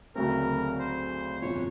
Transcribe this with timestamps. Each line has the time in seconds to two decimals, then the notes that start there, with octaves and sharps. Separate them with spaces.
0.15 D2 C#3 F#3 A3 C4 A#4
0.79 C5
1.41 G1 F2 C3 C#5